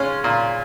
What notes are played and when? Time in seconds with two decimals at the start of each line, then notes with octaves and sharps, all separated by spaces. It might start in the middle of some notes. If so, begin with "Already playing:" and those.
Already playing: G#3 C#4 F4
0.24 A#2